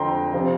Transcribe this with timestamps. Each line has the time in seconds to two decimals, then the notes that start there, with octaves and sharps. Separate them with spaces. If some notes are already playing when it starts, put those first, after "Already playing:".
Already playing: F2 D3 G5 A#5 C6
0.33 C3 F3